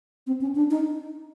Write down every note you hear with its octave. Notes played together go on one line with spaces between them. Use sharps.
C4
C#4
D4
D#4